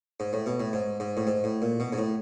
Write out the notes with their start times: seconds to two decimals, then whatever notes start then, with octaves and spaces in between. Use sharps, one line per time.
0.20 G#2
0.33 A2
0.46 B2
0.60 A2
0.73 G#2
1.00 G#2
1.17 A2
1.27 G#2
1.44 A2
1.62 A#2
1.80 B2
1.92 G#2
1.98 A2